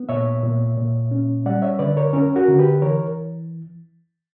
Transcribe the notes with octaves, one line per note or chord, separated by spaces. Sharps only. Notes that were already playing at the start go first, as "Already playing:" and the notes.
Already playing: B3
A#2 C#5 E5
A#2
A#2
C#4
G3 D5 F#5
C#5 E5
D3 B4 D5
A#4 C#5
C#4 A#4 C#5
F#4 A#4
D3
G4 B4
E3 A#4 C#5